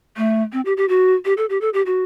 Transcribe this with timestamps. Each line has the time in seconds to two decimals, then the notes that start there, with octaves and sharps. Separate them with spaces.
0.17 A3
0.53 C4
0.65 G4
0.77 G4
0.89 F#4
1.25 G4
1.37 A4
1.49 G4
1.61 A4
1.74 G4
1.86 F#4